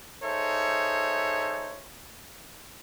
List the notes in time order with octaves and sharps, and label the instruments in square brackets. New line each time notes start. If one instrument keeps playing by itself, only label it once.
[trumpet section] D#4 G#4 A4 C5 C#5 E5